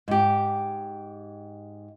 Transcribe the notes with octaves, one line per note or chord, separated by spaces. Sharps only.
G#2 G4